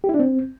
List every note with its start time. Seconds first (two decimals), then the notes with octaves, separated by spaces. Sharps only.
0.04 G4
0.09 E4
0.14 D4
0.19 C4